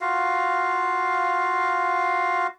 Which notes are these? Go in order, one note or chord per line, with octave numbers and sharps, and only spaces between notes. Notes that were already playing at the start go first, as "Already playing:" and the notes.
F4 F#4 F5